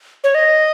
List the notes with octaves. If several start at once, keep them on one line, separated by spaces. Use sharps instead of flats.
C#5
D#5